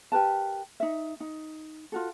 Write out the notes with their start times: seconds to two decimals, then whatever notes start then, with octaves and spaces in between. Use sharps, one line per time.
0.12 G4 A#4 B4 A5
0.80 D#4 E5
1.20 D#4
1.92 F4 F#4 A4